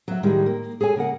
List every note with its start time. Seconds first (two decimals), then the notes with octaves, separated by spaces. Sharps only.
0.08 F#3 E5
0.23 A2 D#3 G3 G#3 E4
0.46 A#3
0.81 G#4 A4 C#5 G#5
0.96 C#3 A#3 A#4 F#5